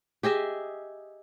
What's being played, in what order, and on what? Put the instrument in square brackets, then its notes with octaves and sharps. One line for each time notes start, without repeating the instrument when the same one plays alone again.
[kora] G4 G#4 D#5 E5